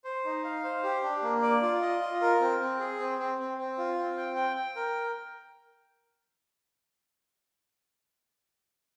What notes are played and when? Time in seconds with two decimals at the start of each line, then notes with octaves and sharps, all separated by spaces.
0.04 C5
0.25 D#4
0.44 F5
0.64 C5
0.83 G4
1.03 D4
1.23 A#3
1.42 D5
1.62 F4
1.81 D#5
2.01 F4
2.21 A#4
2.40 C4
2.60 C4
2.79 G#4
2.99 C4
3.18 C4
3.38 C4
3.58 C4
3.78 F4
3.97 C4
4.17 G5
4.36 G5
4.56 G5
4.76 A#4